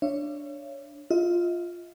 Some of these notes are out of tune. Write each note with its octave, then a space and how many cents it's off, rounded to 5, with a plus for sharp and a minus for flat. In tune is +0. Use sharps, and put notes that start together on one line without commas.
D4 +0 C#5 +0 E5 +45
F4 +0 D#5 +45